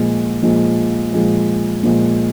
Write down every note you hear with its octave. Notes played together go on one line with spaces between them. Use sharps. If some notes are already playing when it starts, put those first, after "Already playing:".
Already playing: A#2 F3 G#3
A#2 F3 G#3
A#2 F3 G#3
A#2 F3 G#3